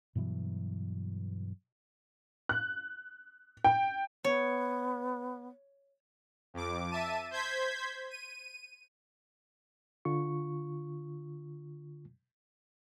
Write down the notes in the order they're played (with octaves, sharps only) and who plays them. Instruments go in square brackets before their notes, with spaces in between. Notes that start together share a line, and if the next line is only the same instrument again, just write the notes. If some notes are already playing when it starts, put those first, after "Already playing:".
[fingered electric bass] G2 B2 E3 F#3
[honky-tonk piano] F#6
G5
[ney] B3 [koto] C#5
[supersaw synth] F2 D6
E5 A5 D#7
C5 G6 G#6 B6
D#7
[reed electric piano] D3 F4 C#6